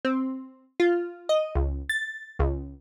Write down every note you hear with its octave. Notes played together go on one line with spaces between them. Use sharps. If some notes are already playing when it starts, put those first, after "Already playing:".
C4
F4
D#5
C#2
A6
C#2